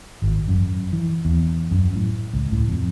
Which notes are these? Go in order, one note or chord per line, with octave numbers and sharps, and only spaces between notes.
G#1
F#2
E3
E2
F#2
A2
C#2
A2
F2